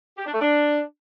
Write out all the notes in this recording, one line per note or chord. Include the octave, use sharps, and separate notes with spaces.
G4
D4
A3
D4